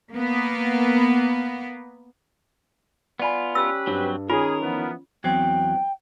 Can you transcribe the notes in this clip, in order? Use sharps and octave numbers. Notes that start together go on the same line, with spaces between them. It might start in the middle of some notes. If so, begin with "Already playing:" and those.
A#3 B3
B3 F4 D5 G#5 B5
C#4 G4 B4 E6
G2 F#3 C4
D#3 C#4 F4 G#4 A#4
E3 F3 B3
E2 F#3 C4 G5